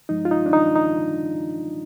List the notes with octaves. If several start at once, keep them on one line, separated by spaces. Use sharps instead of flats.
G2 F3 G#3 D#4
F4
D#4
D4
D#4
D#4